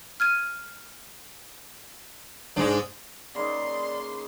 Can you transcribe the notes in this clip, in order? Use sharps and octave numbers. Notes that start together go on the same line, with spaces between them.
F6 G#6 D#7
G#2 G#3 D4
C#3 A#3 D#4 D5 C6